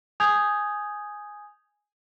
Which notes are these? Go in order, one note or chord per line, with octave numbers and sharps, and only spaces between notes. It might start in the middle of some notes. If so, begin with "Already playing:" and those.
G#5 D#6 G6 G#6 F7